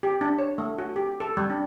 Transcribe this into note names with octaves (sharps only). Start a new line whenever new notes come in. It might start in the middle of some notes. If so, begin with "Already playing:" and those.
G4
D4
C#5
A3
F#4
G4
A4
G3
D4